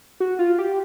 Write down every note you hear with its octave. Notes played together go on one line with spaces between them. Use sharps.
F#4
F4
G4